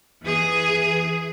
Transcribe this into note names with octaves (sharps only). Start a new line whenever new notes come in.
E3 G#4